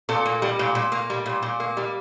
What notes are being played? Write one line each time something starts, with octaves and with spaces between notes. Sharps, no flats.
A#2 A4
A#3
G3
A#2
A#2
A#3
G3
A#2
A#2
A#3
G3